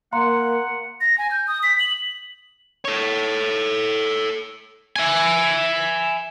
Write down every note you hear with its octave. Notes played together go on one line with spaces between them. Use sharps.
A#3 F5 F#5 A#5 C6
A#6
G#5
G6
D#6
B6
F#7
A4 C#5
E5 G#5